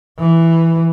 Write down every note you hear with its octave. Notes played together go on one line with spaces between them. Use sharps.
E3